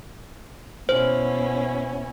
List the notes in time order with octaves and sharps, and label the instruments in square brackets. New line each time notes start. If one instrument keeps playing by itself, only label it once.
[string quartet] B2 C#4 E4 [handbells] C5